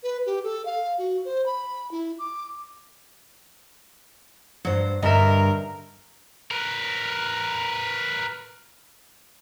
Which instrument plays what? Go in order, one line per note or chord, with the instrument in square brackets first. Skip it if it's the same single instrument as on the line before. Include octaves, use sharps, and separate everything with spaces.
[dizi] B4
G4
A4
F5
F#4
C5
B5
E4
D6
[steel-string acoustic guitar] G2 C5 [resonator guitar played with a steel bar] F#3
[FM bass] G2 [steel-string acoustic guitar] D3 [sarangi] A#4 [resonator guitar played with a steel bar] D#5 E5
[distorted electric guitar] A#4 B4